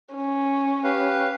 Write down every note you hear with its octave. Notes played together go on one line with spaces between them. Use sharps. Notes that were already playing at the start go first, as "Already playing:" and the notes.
C#4
G4 B4 F5